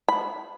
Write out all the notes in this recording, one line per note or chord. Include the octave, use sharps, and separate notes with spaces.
B5